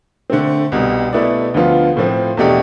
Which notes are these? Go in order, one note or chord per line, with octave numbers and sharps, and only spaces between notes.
D3 A3 C4
C2 B2 G3
B2 A3 E4 B4 D5
D2 D3 F3 B3 F4
A2 F3 C4
E2 B2 A3 D4 G4